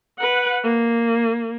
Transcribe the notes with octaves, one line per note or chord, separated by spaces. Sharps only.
B4 F#5
A#3